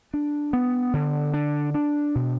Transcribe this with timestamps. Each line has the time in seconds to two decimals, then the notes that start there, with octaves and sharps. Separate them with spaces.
0.14 D4
0.53 B3
0.94 D3
1.34 D4
1.74 D4
2.15 B2